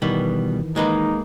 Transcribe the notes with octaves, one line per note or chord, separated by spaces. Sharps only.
B2 D#3 E3 G3 B3
G#3 A#3 D#4 B4